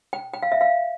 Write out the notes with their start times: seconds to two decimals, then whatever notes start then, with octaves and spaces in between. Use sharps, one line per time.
0.13 G5
0.33 G5
0.43 F5
0.52 E5
0.61 F5